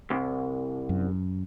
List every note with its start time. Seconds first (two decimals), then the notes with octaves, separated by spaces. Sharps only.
0.10 C2
0.89 F#2